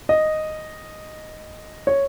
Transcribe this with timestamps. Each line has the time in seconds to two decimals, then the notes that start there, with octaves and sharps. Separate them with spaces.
0.09 D#5
1.87 C#5